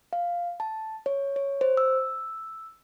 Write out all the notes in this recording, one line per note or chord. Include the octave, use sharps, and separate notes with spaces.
F5
A5
C#5
C#5
C5
E6